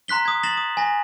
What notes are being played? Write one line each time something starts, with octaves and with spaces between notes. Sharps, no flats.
A#5 C6 F#6 B6 G7
D#6 G#6
A6 A#6 C7 E7 F#7 G7
D#6
G#5 A#6